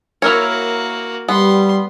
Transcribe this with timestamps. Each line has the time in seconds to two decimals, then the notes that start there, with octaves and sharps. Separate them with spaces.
0.22 A#3 E4 F#4 A#4 C#5
1.28 G3 B3 C6